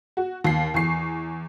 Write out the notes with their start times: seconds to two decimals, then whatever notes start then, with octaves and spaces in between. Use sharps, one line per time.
0.17 F#4
0.44 D#2 C7
0.74 E2 C#6 C7